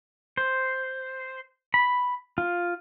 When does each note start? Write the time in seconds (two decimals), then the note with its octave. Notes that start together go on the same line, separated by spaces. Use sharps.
0.37 C5
1.74 B5
2.38 F4